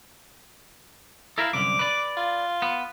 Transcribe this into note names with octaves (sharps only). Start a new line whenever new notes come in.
E4 A4 A#4 F5
C2 F#2 D3 D6
B4 D5
F4
B3